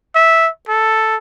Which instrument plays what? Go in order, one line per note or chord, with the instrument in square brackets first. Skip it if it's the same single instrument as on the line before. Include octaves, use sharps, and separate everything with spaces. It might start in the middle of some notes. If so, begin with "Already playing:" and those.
[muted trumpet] E5
A4